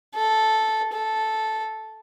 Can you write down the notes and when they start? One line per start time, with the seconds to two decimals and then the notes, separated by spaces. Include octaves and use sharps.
0.15 A4
0.93 A4